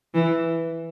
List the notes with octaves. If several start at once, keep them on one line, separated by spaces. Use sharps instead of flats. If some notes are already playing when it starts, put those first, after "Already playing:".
E3